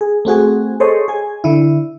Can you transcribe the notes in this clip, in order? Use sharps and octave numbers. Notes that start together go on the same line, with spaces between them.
G#4
A3 C4 F#4 G#4
G#4 A4 C5 C#5 D#5
G#4 G#5
D3 E4